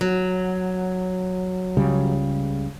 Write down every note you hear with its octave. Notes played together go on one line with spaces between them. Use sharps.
F#3
C#2 C#3 G3